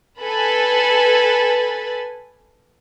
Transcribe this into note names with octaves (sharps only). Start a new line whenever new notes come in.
A4 B4 G#5 B5 A6